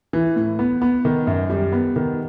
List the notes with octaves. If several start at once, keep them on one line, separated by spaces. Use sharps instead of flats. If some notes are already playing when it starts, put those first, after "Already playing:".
E3
A2
B3
B3
D#3
F#2
G3
B3
D#3